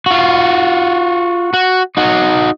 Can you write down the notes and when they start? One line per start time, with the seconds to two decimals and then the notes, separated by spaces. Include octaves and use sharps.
0.06 F4 F#4
1.54 F#4
1.97 D#4 F#4